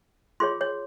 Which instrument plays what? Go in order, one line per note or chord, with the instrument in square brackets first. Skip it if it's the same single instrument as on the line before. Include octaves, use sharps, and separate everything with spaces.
[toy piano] F4 G#4 C#5 C6
C#5